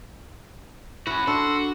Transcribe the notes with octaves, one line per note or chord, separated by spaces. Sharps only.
C#4 E4 F#4
D4 F#4 A4 C6